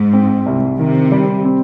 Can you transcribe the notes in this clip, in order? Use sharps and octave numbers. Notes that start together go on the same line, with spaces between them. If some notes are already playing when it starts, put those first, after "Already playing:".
Already playing: G#2
C4
C2
C3 D#3
G3
C4